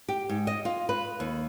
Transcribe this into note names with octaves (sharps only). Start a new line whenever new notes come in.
G4
G#2
D#5
F4
B4
D#2